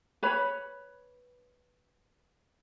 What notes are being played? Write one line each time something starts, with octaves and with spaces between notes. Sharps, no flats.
B4 C#5 B5